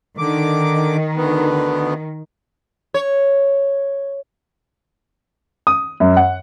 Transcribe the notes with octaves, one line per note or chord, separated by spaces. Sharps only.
D3 D#3 D6
D2 B3
C#5
D#6
F#2
F#5